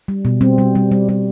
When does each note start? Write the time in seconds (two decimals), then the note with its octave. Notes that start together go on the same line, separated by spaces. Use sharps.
0.08 G3
0.25 B2
0.41 G3 C4
0.58 G3
0.75 G3
0.92 G3
1.09 G3